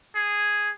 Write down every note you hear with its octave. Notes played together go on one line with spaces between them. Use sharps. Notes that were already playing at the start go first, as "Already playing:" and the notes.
G#4